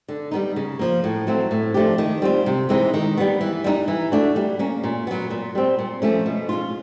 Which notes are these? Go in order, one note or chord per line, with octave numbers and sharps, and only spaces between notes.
D3
G3 B3 D#4
C#3
F3 A#3
A2
F#3 A3 C4
A2
F3 A3 D4 G4
D#3
G3 C4 F4
C3
E3 G#3 C4 D#4
D#3
G3 B3
E3
G3 B3 D#4
E3
A3 D4 F#4
G3
A#3 C#4
A#2
F#3 B3
A#2
G3 C4
A#2
F3 A3 C#4
B2
G#3 C#4 F4